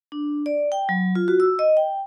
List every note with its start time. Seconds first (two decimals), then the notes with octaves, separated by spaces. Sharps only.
0.12 D4
0.46 D5
0.72 G5
0.89 F#3
1.15 F4
1.28 F#4
1.40 E6
1.59 D#5
1.77 G5